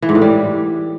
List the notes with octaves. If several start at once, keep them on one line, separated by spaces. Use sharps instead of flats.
E3
G#2
A2
G3